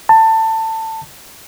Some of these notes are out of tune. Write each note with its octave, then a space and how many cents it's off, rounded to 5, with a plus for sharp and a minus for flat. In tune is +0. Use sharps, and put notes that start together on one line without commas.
A5 +20